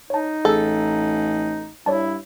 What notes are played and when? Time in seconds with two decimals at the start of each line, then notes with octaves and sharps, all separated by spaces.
0.10 D#4 C#5 A5
0.45 A1 G#4 A4 E6
1.86 G2 E4 C#5 D5 A5